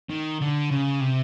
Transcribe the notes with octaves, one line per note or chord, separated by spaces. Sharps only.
D#3
D3
C#3
C3